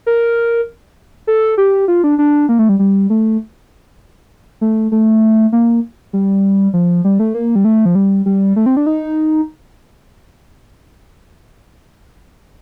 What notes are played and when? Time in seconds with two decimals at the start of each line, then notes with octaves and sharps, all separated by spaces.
0.06 A#4
1.27 A4
1.58 G4
1.88 F4
2.04 D4
2.19 D4
2.49 A#3
2.59 A3
2.69 G3
2.79 G3
3.10 A3
4.61 A3
4.92 A3
5.52 A#3
6.13 G3
6.74 F3
7.05 G3
7.19 A3
7.34 A#3
7.56 G3
7.65 A3
7.85 F3
7.95 G3
8.26 G3
8.56 A3
8.66 C4
8.77 D4
8.86 D#4